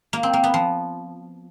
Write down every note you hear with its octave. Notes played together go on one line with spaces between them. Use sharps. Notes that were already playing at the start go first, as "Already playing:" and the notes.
A#3
C4
A#3
B3
F3